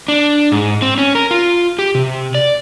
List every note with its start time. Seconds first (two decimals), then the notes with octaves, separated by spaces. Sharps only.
0.08 D4
0.52 G#2
0.82 C4
0.98 C#4
1.15 A#4
1.31 F4
1.79 G4
1.95 C3
2.35 D5